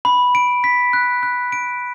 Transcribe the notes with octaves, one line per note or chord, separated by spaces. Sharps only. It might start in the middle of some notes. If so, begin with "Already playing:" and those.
B5
D7
B6
F#6
F#6
D7